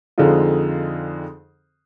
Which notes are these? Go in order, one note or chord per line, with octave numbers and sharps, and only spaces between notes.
F2 D3 G#3 C4 D#4 F4